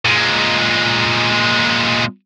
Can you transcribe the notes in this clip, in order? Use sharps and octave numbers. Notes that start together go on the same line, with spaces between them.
A#2 G#3